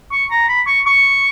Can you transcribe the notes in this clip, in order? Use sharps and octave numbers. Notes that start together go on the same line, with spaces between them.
C#6
A#5
B5
C#6
C#6